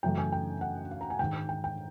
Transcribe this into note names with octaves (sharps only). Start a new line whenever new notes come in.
F#2 C#3 E3 A3 G5
G#5
G5
F#5
F5
A#5
G#5
G#2 D#3 G#3 G5
G5
G5